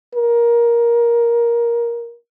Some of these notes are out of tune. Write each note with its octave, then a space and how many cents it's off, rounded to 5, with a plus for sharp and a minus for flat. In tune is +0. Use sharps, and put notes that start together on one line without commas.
A#4 +15